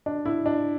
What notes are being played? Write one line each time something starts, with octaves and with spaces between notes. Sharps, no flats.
D4
E4
D4